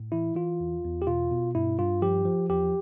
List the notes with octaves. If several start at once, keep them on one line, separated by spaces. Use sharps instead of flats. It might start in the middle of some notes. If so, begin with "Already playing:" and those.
Already playing: A2
E3 E4
E3 F4
E2
E2
G4
B2 F4
B2
G2 E4
G2 F4
F3 G4
F3
E2 G4